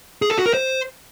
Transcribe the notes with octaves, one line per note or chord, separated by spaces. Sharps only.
G#4
A4
F#4
A#4
C5